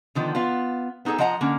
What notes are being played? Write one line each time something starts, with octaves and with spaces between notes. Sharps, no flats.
D3 D#3 F3 B3
B3 F4 F5
B3 D#4 F#4 G#4 A4
F3 F4 D#5 F#5 A#5
D3 A#3 C#4